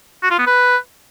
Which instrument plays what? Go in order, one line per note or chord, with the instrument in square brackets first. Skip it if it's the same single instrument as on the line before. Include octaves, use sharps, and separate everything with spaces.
[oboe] F#4
F4
B3
B4